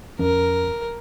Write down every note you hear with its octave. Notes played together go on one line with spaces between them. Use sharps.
F2 F3 C#4 A#4